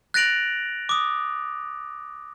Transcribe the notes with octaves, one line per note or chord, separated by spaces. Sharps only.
F#6 A6 A#6 D7 F7 F#7
D6 D#6